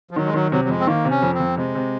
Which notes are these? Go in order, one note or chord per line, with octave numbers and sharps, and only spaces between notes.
F3
D#3 F#3
G#3
D#3 F#3
C3 F#3
F#3
F2 G#3
C4
D#3 A#3
C3
C#4
F2
C4
F2
C3 G#3
C3